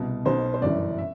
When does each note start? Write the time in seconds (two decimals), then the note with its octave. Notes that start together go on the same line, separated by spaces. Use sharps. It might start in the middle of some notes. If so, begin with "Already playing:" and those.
Already playing: C2 B2
0.25 B1 B2 C5
0.54 C5
0.62 G1 F#2 E3 D5
0.98 E5